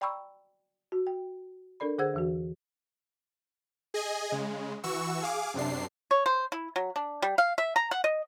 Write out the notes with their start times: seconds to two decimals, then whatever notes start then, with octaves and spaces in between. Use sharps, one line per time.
0.01 D5 G5 A#5 B5 C#6 E6
0.92 F#4
1.07 G5
1.80 D4 A4 A#4 D5 B5
1.98 D3 G#4 C5 F#5 E6 G#6
2.14 E2 E3 F#4
3.94 G#4 D#5 G#5
4.32 C#3 G#3
4.84 E3 F#4 C#6 E6
5.22 G#4 F5 D6
5.54 F#2 C3 D4 C7
6.11 C#5
6.26 C5
6.52 E4
6.76 F#3
6.96 D4
7.22 G3
7.38 F5
7.58 E5
7.76 A#5
7.91 F#5
8.04 D#5